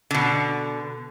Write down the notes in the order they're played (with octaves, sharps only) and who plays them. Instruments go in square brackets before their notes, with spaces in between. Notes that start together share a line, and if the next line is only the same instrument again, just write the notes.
[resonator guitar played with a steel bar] B2 D3